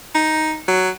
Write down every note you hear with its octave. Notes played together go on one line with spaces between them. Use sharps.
D#4
F#3